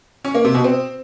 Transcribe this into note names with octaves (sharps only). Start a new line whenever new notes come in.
C#4
A#3
C3
B2
C4